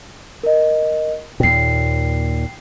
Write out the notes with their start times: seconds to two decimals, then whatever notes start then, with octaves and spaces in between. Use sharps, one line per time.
0.44 A#4 D#5
1.40 D#2 A#2 G5 C7